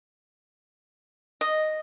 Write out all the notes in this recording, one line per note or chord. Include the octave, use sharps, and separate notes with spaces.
D#5